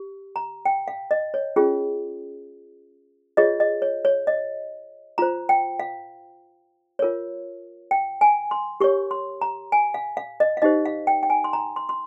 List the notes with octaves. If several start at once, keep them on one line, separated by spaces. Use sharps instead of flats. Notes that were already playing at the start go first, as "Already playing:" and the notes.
Already playing: G4
A#5
G5
F5
D#5
C#5
C#4 F4 G#4
F4 G#4 C#5 D#5
D#5
C#5
C#5
D#5
F4 C5 A#5
G5
F5
F4 A#4 C#5
G5
G#5
C6
G4 A#4 C#5 C#6
C6
A#5
G#5
F5
F5
D#5
F5
D#4 G4 C5 D#5
F5
G5
G5
G#5
C6
A#5
C6
C6